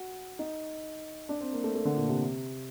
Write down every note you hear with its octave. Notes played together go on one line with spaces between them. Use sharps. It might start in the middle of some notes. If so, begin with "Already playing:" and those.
Already playing: F#4
D#4
D4
C4
A#3
A3
A3
D3
A#2
C3